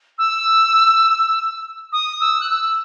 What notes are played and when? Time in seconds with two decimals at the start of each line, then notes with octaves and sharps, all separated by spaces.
0.18 E6
1.92 D#6
2.20 E6
2.40 F#6
2.50 E6